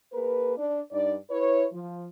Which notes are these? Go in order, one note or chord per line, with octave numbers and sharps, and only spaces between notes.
A#3 G#4 A#4 B4
D4
G2 D4 D#4 D5
E4 B4 C#5
F3